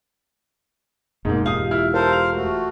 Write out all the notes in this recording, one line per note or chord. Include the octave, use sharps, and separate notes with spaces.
E1 G#2 A#3
F4 G4 F5 D#6
E4 F6
A4 A#4 C5 F5
F7
A3 F#4